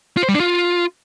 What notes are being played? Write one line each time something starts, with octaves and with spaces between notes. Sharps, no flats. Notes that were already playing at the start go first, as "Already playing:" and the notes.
F4
C5
G3
D4
F4